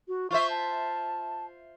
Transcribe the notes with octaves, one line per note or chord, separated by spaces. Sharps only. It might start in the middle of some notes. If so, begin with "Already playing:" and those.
F#4
F4 C5 E5 C#6
A5